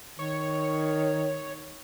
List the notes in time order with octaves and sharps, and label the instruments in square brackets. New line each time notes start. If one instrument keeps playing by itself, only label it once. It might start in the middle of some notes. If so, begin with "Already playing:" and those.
[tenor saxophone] D#3 [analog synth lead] C#5